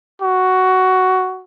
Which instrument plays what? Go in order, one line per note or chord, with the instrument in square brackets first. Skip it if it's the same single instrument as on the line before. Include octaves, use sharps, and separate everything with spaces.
[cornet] F#4